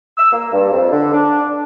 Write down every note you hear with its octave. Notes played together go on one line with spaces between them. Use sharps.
E6
A#3
G2
F2
D3
D4